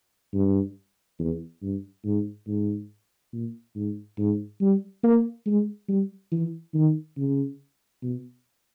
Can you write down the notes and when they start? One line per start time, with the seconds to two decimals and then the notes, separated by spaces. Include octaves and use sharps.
0.34 G2
1.19 E2
1.62 G2
2.04 G#2
2.47 G#2
3.32 A#2
3.75 G#2
4.18 G#2
4.61 G3
5.03 A#3
5.46 G#3
5.88 G3
6.32 E3
6.74 D#3
7.17 C#3
8.02 B2